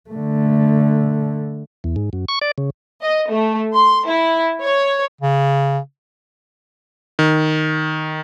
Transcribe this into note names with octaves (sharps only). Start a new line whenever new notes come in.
D3 A3
E2
G#2
F#2
C#6
D5
C#3
D#5
A3
C6
E4
C#5
C#3
D#3